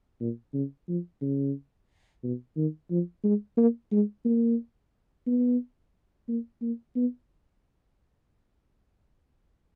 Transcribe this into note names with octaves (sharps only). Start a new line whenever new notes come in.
A#2
C#3
F3
C#3
B2
D#3
F3
G#3
A#3
G#3
A#3
B3
A#3
A#3
B3